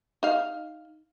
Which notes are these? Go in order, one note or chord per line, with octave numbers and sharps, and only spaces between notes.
D#4 F5